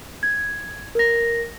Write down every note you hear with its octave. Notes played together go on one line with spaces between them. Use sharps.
G#6
A#4 A#6